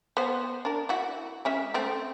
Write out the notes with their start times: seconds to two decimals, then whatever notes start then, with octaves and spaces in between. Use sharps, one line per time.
0.17 B3 C5
0.65 D4 A#4
0.89 E4 F#4
1.45 G#3 C#4 E5
1.74 A3 C4